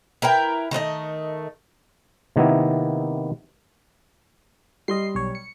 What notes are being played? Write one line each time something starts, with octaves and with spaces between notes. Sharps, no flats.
E4 A#4 B4 G5
D#3 A3 B4 D#5
C3 D#3 A#3 B3 E4
G3 D#5 C6 C7
B1 C#5
C#7